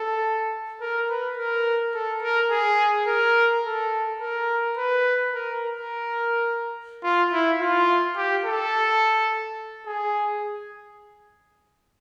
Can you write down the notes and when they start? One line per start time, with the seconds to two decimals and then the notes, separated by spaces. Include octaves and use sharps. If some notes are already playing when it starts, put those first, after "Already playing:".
Already playing: A4
0.81 A#4
1.09 B4
1.37 A#4
1.94 A4
2.22 A#4
2.51 G#4
3.07 A#4
3.64 A4
4.20 A#4
4.77 B4
5.33 A#4
5.62 A#4
7.03 F4
7.32 E4
7.60 F4
8.16 G4
8.44 A4
9.86 G#4